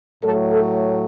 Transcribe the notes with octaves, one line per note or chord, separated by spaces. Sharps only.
A2 F#3 A3 A4
A4